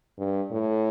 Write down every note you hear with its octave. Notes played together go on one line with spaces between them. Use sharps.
G2
A2